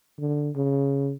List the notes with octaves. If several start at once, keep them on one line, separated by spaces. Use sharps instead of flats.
D3
C#3